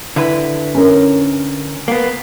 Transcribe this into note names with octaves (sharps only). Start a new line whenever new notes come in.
D3 E4 B4
C#4 A#4
A#3 B3